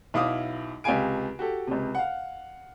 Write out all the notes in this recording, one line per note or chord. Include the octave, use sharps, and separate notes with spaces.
B1 E4 F5 D6 D#6
C#2 C3 G4 F5 G#5 D7
F#4 G4 A4
C#2 C3
F5 F#5